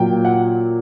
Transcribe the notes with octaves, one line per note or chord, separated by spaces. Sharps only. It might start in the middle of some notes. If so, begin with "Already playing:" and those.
Already playing: A#2 F#3 G5
F#5